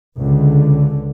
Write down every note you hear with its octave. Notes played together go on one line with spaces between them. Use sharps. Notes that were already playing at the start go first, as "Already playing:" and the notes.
C#2 D3